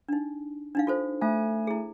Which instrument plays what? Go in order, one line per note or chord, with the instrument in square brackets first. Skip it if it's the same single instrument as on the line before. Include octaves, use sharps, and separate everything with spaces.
[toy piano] D4 D#4
D4 D#4 F5
F4 A4 C5
[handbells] A3 G#5
[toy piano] E4 G#4